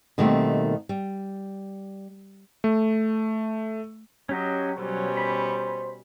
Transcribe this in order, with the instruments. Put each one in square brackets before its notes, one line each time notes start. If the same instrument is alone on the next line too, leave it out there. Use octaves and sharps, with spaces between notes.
[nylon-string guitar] B2 D#3 G3 A3 A#3 C4
G3
[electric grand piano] A3
[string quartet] F#3 [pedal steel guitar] C#4 G4 D#5
[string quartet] B2 G3 C#4 [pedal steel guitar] F#3 [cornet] C5
[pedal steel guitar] B5